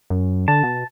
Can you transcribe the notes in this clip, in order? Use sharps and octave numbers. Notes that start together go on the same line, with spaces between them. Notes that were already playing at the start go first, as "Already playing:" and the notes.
F#2
D3 A5
B2